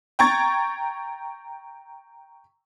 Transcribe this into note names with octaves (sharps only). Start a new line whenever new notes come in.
G5 A#5 C#6 G#6 A6